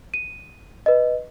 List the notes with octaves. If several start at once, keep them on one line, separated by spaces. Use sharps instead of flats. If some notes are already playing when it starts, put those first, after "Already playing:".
D#7
B4 D#5